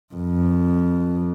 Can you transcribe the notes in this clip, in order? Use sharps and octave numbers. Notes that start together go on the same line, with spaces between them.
F2